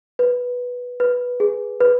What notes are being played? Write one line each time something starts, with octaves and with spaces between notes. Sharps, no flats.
B4
B4
G#4
B4